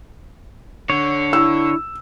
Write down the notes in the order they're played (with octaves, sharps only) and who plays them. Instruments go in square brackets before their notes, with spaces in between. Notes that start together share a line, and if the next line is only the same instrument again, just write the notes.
[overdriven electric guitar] D3 [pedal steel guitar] C#5
[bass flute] E4 [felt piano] E6